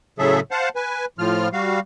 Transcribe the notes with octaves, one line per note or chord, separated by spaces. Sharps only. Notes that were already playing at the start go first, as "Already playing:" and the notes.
A2 C#3 F#3 G#4 A4 E5
C5 F5 F#5 A5
B4 G#5
A2 F3 F4 F6
G3 F#4 F5